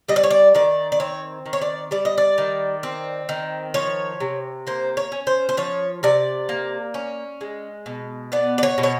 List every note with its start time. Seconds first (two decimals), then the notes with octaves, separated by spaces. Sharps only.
0.08 G3 D#5
0.16 D5
0.24 C#5
0.31 D5
0.55 D#3 D5
0.92 D5
1.00 C4 C#5
1.46 D#3
1.53 C#5
1.62 D5
1.91 G3 D5
2.05 D#5
2.18 D5
2.38 D#3
2.83 C4
3.29 D#3
3.74 F3 C#5
4.20 C3
4.67 A#3 C5
4.97 C#5
5.12 C#4
5.27 C5
5.49 C5
5.57 F3 C#5
6.03 C3 D5
6.49 A#3
6.94 C#4
7.41 G#3
7.86 B2
8.32 B3 D5
8.58 D5
8.63 C#5
8.78 B2
8.83 C#5